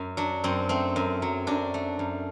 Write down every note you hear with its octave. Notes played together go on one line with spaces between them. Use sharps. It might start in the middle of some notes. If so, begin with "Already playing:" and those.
Already playing: F#2
F#3 D4
F#2 C4
A3 C4
F#2
F#3
F#2 D4
A3
F#2